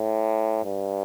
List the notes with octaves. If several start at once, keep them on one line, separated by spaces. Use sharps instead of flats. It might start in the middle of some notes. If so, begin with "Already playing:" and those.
Already playing: A2
G2